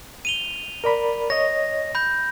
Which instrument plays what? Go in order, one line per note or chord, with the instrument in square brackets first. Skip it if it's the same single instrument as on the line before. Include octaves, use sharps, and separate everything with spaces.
[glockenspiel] D#7 F7 G7
[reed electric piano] A#4 D5 B5
[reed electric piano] C#5 D#5 [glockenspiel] A#6
[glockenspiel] B5 G6